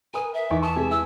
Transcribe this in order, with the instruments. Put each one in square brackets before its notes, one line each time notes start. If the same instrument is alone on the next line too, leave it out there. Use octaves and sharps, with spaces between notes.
[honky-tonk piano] A#4 B4 D#6 [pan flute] G#5
[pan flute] E5
[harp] E2 D5 B6 [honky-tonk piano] D#4 G#5 C#6
[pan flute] A5 [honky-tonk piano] C#6 D#6
[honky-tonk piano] C3 G#3 [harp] G#5 B6
[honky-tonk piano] E4 [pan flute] E6